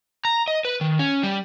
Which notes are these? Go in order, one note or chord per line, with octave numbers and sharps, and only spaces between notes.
A#5
D#5
B4
D#3
C#4
G3